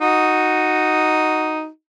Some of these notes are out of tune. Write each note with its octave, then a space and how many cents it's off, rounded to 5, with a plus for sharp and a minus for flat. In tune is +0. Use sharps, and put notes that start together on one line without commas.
D#4 +0 F#4 +0